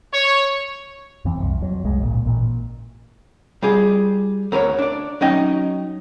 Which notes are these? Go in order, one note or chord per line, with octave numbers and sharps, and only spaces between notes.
C#5
F2 E3 F3 C4
F#1 C2
F2 F#3
C2 F2 G#3
G#1 C#2 A#2
A1 A#2
G3 F4 G#4
D2 A#4 B4 C#5
D4 D5
F#3 C#4 D#4 D#5 G5